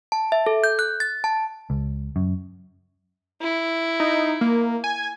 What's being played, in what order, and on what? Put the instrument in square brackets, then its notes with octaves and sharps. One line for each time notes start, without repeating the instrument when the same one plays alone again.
[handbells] A5
E5
A4
G6
F#6
A6
A5
[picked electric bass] C#2
F#2
[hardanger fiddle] E4
[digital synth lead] D#4
A#3
G#5